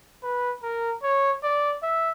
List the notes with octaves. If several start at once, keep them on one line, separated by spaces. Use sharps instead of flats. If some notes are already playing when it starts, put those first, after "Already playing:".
B4
A#4
C#5
D5
E5